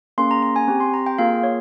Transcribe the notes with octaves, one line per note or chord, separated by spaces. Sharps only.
A#3 C#4 G#4 C6
A#5
A#5
G#5
C4 G4
C6
A#5
G5
A#3 F4 G#4 F5
C#5